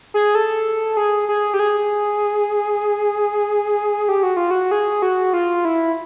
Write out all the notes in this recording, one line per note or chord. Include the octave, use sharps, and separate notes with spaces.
G#4
A4
G#4
G#4
G4
G#4
G4
F#4
F4
F#4
G#4
F#4
F4
E4